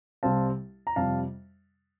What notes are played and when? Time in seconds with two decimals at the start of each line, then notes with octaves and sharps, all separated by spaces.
0.23 C2 C3 G3 C4 F5 A5
0.87 A#5
0.96 F2 C3 G3 F5 A5